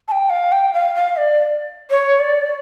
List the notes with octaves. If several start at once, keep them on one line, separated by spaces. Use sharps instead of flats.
A5
G5
F5
G5
F5
F5
D5
C#5
D5